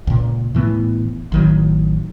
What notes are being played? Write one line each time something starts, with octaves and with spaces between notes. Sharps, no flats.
C#2 A#2
A2 E3 B3
A1 D#3 F#3